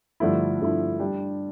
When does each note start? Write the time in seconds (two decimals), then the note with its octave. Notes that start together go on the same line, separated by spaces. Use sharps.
0.20 G2 D3 F3 A3 E4
0.60 G2 D3 F3 A3 E4
0.99 G3 D4 G4